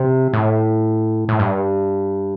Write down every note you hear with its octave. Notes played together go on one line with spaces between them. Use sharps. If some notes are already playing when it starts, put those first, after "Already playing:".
Already playing: C3
A2
A2
G2